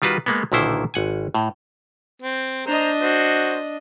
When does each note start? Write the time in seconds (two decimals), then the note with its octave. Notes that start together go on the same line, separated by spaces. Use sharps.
0.02 D#3 G3 F4 F#4 B4
0.26 G#3 A#3 B3
0.52 B1 A#2 D3 D#3 E4 C5
0.94 G#1 F#5 G#5
1.35 A2
2.22 C4
2.67 D4 C5 D#5 A#5
3.02 F#4 C5